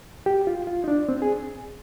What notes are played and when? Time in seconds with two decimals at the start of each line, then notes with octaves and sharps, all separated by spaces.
0.26 G4
0.47 F4
0.67 F4
0.84 D#4
0.88 D4
1.09 C4
1.22 G#4